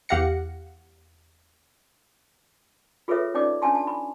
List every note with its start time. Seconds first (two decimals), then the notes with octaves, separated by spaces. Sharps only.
0.09 E2 G4 F5 F#5 A#6 C#7
3.08 F4 G#4 A4 B4 C#5 E5
3.34 C#4 D#4 D5 D6
3.62 C#4 D4 G#5 A5 C6
3.75 A5
3.87 B5